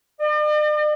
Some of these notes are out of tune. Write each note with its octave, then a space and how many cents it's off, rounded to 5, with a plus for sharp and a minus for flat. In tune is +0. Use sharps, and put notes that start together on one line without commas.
D5 +45